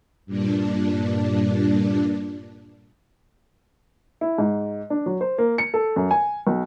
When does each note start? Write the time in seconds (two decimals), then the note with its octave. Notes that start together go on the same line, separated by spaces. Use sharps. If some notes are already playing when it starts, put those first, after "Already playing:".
0.26 G2 A#2 D4
4.21 E4
4.38 G#2
4.90 D4
5.06 F#3
5.21 C5
5.38 A#3
5.58 C#7
5.74 A4
5.96 F#2
6.11 G#5
6.47 B1